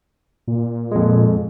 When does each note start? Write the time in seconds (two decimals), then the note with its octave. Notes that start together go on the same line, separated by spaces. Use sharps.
0.47 A#2
0.92 F2 G#3